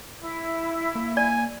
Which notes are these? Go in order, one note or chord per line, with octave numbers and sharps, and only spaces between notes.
E4
A#3
D5 G#5